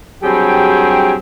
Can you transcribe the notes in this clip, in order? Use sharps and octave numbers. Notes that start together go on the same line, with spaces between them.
G2 F#3 C4 G4 G#4 G5